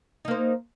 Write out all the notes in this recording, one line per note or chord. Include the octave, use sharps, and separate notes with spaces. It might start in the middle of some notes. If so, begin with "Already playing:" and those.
A#3 D#4 C5